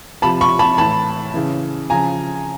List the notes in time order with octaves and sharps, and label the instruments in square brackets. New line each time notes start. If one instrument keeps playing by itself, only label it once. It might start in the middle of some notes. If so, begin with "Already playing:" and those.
[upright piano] C3 F3 A5 B5
B5 C#6
A5 B5
A2 E3 A5 B5
C#3 E3
C#3 F3 G#5 A#5